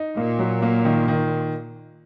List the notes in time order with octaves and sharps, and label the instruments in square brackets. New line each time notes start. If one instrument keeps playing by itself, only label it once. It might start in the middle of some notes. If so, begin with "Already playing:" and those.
Already playing: [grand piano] D#4
[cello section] A#2 [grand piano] A#3
[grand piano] F#3
A#3
D#3
D#3